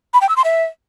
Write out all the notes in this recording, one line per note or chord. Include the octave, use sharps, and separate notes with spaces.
B5
G5
E6
C6
E5